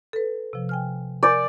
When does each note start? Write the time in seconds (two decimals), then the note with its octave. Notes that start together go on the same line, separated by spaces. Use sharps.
0.13 A4 B4
0.53 C3 F3
0.69 G5 G#5 F6
1.23 A#4 D5 G#5 G6